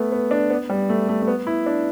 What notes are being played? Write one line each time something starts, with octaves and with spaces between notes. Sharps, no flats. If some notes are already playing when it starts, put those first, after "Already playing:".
Already playing: A3 B3
B3
D4
B3
G3
A3
A3
A3
B3
E4
D4